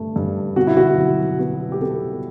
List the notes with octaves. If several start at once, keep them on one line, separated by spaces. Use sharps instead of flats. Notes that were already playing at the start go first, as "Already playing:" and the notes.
Already playing: G2 A3
G2
B2 F#4
E4
F#4
F#3
B3 F#4
G4
B3 A4